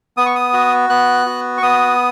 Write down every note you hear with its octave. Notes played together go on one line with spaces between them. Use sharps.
B3 D#6
C#6
D#6
F#4
B3 F#6
F#4
C#6
B3 D#6